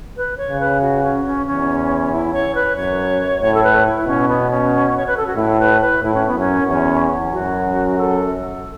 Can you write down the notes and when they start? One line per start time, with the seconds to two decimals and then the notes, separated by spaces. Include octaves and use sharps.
0.17 B4
0.38 C#5
0.49 C#3
0.60 B4
0.81 F#4
1.03 C#4
1.25 C#4
1.46 E2 C#4
2.12 E4
2.33 C#5
2.55 B4
2.76 F#2 C#5
3.41 A2 C#5
3.54 A4
3.64 B4
3.86 E4
4.07 B2 C#4
4.28 B3
4.51 C#4
4.97 C#5
5.07 B4
5.17 A4
5.27 F#4
5.37 A2 E4
5.59 B4
5.81 B4
6.03 A2 E4
6.14 C#4
6.27 B3
6.35 F#2 C#4
6.68 E2 C#4
7.33 F#2 F#4
7.98 A4